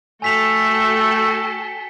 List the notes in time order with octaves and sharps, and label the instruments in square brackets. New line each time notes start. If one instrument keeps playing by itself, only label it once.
[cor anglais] A3 [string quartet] F#4 A4 G5 [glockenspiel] G#5 B6 F7